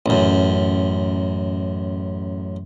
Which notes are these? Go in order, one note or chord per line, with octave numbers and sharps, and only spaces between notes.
A1 F#2